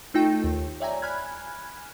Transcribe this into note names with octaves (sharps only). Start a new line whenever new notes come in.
A3 D#4 F4 A4 G5
D#2
C#5 D5 E5 G5 G#5 A#5
G#5 B5 F6 F#6 G#6